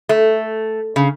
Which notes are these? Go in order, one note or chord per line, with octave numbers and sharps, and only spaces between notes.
A3
C#3